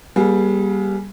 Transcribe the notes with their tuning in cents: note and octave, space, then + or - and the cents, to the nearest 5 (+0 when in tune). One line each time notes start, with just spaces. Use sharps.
G3 +0 A#3 +40 G#4 +20